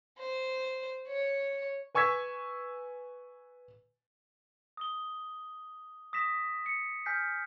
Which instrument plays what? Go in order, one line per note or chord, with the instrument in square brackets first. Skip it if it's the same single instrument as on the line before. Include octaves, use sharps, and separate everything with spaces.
[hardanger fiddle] C5
C#5
[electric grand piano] B4 G#5 C#6 E6 G#6 B6
[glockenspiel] D#6 G7
D#6 A#6 B6 E7
C#7
G#5 F6 G6 B6 C7